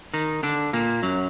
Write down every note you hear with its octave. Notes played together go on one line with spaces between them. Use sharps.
D#3 D#4
D3 D4
A#2 A#3
F#2 F#3